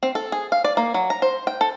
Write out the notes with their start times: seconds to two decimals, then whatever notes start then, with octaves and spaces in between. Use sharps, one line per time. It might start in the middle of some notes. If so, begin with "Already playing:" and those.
0.03 C4
0.15 A4
0.32 G#4
0.52 F5
0.64 D5
0.77 A#3
0.94 F#3
1.10 A#5
1.22 C5
1.47 G5
1.61 A4